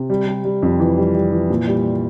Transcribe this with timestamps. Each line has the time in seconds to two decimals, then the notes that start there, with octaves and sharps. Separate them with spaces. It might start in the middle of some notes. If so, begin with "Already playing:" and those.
Already playing: C3
0.10 G3
0.27 G3
0.45 G3
0.63 F2
0.80 E3
0.97 G3
1.15 G3
1.32 E3
1.50 A#2
1.67 G3